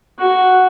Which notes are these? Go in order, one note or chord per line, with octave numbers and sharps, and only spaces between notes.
F#4